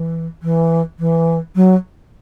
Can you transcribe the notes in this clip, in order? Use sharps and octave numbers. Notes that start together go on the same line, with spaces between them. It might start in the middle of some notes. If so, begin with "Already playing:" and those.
Already playing: E3
E3
E3
F#3